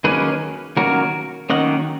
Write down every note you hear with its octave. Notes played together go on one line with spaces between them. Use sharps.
D#3 F#3 A#3 C#4 G#4 B4
D#3 F#3 A#3 C#4 F#4 A#4
D#3 F#3 A#3 C#4 D#5 F#5